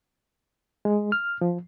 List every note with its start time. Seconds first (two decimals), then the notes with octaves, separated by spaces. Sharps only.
0.85 G#3
1.12 F6
1.41 F3